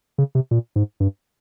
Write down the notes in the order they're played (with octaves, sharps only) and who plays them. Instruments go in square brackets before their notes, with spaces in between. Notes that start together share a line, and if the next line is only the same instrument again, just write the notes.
[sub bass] C#3
C3
A#2
G#2
G2